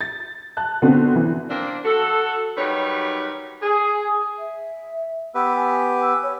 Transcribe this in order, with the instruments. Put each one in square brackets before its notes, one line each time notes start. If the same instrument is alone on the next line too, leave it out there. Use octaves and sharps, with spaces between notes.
[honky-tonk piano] A6
A5 F#6
D3 B3 C4 F#4
E3
[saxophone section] A#3 C4 D4
F#4 A4
D#3 F#3 G3 B4 C#5
[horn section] G#4
[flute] E5
[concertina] B3 G4 B4 [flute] E6
[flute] G#5
E6
C#5